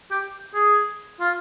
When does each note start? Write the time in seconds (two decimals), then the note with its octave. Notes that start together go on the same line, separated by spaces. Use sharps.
0.11 G4
0.55 G#4
1.20 F4